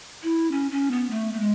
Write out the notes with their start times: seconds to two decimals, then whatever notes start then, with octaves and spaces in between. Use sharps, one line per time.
0.23 E4
0.52 C#4
0.71 C#4
0.91 B3
1.10 A3
1.34 A3
1.40 G#3